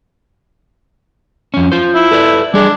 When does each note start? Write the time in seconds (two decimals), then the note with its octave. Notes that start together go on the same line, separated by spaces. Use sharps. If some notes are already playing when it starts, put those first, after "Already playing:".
1.54 F2 C#4
1.72 F4 C5
1.95 E4
2.11 A4 B4 D5
2.54 G3 D4 G#4